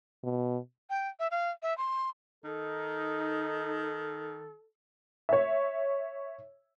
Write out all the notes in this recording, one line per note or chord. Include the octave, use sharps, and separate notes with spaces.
B2
G5
E5
F5
E5
C6
D#3 D#4 A4
C#5 E5